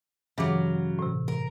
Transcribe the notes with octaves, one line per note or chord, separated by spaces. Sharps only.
G2 C#3 E3 F#3 D6
A2 C3
A#4